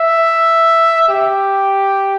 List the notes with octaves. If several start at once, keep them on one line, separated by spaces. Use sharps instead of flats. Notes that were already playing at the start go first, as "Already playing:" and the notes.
Already playing: E5
G4